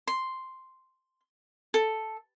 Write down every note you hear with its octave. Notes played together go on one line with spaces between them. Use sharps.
C6
A4